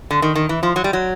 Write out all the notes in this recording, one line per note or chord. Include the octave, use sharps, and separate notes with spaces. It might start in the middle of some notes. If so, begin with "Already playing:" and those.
D3
D#3
D#3
E3
F3
F#3
G3
F#3